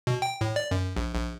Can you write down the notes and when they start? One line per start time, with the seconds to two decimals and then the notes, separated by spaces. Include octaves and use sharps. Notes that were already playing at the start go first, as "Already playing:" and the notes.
0.07 B2
0.22 G5
0.41 A2
0.56 D5
0.71 F#2
0.96 A#1
1.14 A#1